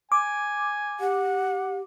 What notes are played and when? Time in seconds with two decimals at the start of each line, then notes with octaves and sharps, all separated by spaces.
0.12 G#5 D6
1.00 G4 F#5